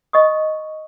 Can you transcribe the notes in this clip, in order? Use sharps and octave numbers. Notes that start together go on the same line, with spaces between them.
D#5 C#6 D#6